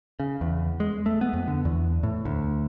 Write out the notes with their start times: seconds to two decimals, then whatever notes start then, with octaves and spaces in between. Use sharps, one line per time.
0.20 C#3
0.41 E2
0.80 G#3
1.06 A3
1.21 B3
1.33 F2
1.48 D3
1.65 E2
2.03 A2
2.25 D2